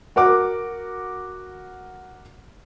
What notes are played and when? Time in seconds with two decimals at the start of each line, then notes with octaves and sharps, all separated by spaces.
0.16 F#4 A#4 F#5 D6